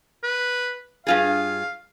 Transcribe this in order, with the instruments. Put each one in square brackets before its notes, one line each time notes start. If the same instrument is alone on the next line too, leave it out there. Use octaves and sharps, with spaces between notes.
[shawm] B4
[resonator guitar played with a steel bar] G2 F4 G#4 [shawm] F5